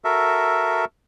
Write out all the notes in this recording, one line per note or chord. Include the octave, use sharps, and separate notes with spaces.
F#4 A4 A#4 E5